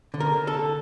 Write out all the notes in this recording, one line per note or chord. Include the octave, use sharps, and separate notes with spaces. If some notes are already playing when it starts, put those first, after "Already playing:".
D3
A#4
D3
A4
D3